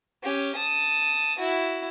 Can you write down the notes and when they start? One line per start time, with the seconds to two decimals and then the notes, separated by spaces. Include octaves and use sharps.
0.23 C#4 G4
0.55 A5 D#6
1.39 E4 F#4